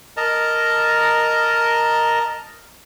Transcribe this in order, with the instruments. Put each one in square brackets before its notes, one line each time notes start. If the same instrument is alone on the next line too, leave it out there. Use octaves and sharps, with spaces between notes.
[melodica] A#4 D#5 A5 A#5